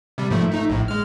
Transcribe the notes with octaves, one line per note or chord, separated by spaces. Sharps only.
C3 G3
G#2 F3 A3
A3 D#4
A#1 A2
G#3 F6